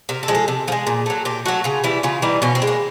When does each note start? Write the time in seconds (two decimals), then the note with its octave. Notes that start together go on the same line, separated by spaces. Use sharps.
0.09 C3 A#4
0.23 A4
0.28 F3 G#3
0.35 A4
0.48 C3
0.67 F3 G#4
0.72 G#3
0.87 A#2
1.06 F#3 A3
1.25 A#2 G4
1.45 F#3 A3 F#4
1.64 C#3 F4
1.84 E3 G3 E4
2.03 C#3 F4
2.22 E3 G3 D#4
2.42 B2 C#4
2.55 C4
2.62 G#3
2.67 A#3